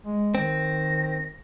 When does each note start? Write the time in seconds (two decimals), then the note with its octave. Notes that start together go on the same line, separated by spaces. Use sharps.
0.06 G#3
0.35 D#3 C4 A#6